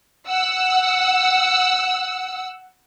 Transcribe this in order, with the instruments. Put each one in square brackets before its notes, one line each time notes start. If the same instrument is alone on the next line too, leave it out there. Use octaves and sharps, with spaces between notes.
[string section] F#5 E6